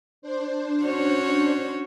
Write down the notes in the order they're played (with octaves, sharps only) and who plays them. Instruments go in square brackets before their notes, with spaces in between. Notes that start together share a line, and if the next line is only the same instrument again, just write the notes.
[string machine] D4 C5
[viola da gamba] C#4 F#4 C#5